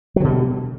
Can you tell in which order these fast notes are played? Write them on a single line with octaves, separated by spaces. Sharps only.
F#3 D3 B2 G3